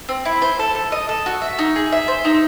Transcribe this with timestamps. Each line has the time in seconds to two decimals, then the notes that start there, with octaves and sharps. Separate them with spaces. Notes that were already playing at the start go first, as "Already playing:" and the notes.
0.09 C4
0.25 E4
0.42 C5
0.59 A4
0.75 A4
0.92 D#5
1.09 A4
1.26 F#4
1.42 E5
1.59 D#4
1.76 G#4
1.92 E5
2.08 C5
2.25 D#4